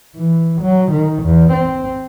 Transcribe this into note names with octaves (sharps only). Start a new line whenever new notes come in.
E3
F#3
D#3
E2
C4